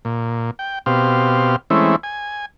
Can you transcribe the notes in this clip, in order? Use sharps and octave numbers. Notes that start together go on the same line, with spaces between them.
A#2
G5
B2 C4 G4 F5
E3 G#3 A3 C4 C#4 E4
G#5